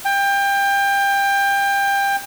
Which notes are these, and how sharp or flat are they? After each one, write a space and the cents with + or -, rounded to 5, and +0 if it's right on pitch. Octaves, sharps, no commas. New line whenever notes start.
G5 +25